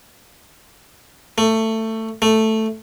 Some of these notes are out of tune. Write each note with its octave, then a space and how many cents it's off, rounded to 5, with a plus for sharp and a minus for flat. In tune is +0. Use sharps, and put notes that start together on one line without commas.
A3 +20
A3 +5